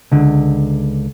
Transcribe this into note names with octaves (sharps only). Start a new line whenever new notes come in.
C#2 D3